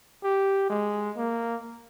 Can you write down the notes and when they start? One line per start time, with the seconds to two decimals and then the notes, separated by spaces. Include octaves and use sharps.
0.24 G4
0.70 G#3
1.17 A#3